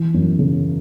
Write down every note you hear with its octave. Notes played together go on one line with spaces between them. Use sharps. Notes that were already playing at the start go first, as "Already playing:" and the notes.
Already playing: E3
F#2
C#3